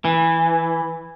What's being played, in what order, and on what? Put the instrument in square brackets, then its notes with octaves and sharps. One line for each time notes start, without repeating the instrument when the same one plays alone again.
[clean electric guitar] E3